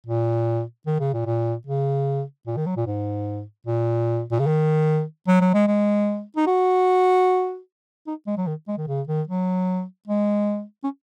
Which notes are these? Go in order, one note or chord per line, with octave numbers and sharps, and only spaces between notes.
A#2
D#3
C#3
A#2
A#2
C#3
A#2
D#3
F#3
A#2
G#2
A#2
A#2
C#3
D#3
F#3
F#3
G#3
G#3
D#4
F#4
D#4
G#3
F#3
D#3
G#3
D#3
C#3
D#3
F#3
G#3
C#4